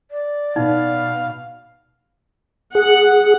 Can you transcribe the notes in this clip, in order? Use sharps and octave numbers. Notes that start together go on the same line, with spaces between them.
D5
B2 D#4 F5
G#4 F#5